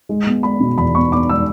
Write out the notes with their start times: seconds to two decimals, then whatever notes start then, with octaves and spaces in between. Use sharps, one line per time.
0.09 G#3
0.27 B3
0.43 G#3 B5
0.60 B2
0.78 E2 B5
0.95 B3 C#6
1.12 B3 D6
1.29 G#3 E6